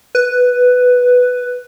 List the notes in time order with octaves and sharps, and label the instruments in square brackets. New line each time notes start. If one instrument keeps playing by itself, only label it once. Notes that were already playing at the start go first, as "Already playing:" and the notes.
[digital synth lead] B4